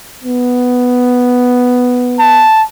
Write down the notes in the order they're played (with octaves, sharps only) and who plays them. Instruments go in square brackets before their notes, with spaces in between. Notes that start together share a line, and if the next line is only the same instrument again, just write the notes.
[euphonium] B3
[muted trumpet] A5